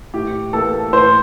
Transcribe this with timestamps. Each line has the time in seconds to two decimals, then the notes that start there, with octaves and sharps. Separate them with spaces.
0.14 A2 G4
0.53 E3 A#3 A4
0.93 A2 C5